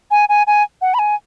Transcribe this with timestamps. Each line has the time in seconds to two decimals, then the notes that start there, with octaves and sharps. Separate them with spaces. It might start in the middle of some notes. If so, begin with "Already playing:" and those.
0.11 G#5
0.29 G#5
0.47 G#5
0.81 F#5
0.94 B5
0.99 G#5